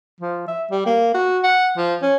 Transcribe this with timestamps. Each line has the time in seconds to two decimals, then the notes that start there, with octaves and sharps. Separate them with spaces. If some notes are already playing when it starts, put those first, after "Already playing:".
0.21 F3
0.48 E5
0.71 G3
0.86 A#3
1.14 F#4
1.44 F#5
1.77 F3
2.02 C#4